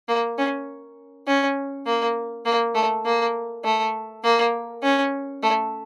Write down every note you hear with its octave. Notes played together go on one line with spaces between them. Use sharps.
A#3
C#4
C#4
A#3
A#3
A3
A#3
A3
A#3
C#4
A3